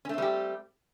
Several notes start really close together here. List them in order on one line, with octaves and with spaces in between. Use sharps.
C#4 A3 C4 G3 G4